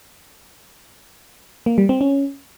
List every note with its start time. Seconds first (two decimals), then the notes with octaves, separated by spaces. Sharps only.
1.66 A#3
1.78 G3
1.89 C4
2.01 C#4